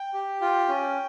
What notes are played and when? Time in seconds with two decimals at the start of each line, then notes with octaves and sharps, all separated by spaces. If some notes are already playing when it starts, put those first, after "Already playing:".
Already playing: G5
0.14 G4
0.41 F4 G5
0.69 C#4